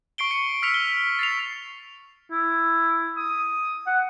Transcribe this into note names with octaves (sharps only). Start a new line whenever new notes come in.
C#6 C7 D7 G7
C#7
E6 F6 B6 C#7 F7
G7
A6 C7 F7
E4
D#6
F#5